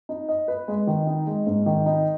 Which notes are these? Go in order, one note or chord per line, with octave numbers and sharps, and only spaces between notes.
D#4
D#5
B4
G#3
D#3
D#4
G#3
G#2
D#3
D#4